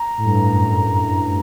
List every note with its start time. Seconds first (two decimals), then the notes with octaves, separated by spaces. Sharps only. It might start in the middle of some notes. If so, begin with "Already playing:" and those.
Already playing: A#5
0.18 A2
0.25 G2
0.32 A2
0.48 F#2